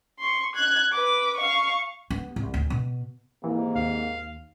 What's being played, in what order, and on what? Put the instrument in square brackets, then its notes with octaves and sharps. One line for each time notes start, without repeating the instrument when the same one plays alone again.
[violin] C6 C#6
F#6 G#6
B4 D6
F5 C#6
[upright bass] B3
C2
D2
B2
[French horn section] G#2 C3 A#3 [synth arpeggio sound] E3
[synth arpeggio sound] D#2 [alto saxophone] F5